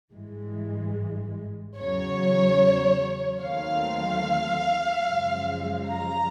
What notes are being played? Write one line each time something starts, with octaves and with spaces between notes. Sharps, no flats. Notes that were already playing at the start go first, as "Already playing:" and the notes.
G#1 G2 E3 G#3
E2 C#3 F#3 C#5
D#2 D#3 F#3 A3 C4 F5
F#2 C#3 F3 G#3
A#5